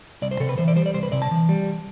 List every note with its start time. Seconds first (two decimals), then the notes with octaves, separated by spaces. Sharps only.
0.22 C2 D5
0.31 C5
0.40 C3 A4
0.49 B4
0.58 E3 C5
0.68 D5
0.76 G3 C5
0.86 D5
0.94 C2 C5
1.03 B4
1.12 C3 D5
1.22 A5
1.31 E3
1.49 G3